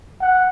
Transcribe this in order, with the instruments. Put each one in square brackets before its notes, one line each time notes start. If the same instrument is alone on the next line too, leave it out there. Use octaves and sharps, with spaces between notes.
[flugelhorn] F#5